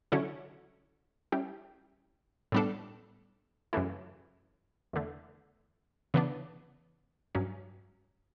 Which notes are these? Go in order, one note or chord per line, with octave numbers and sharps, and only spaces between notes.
D3 F#3 C#4 E4 A4
G3 C#4 E4 G4
A2 G3 B3 D4 A4
F#2 C#3 E3 A3 E4
E2 D3 A3
C#3 E3 B3 D4
G2 F#3 C#4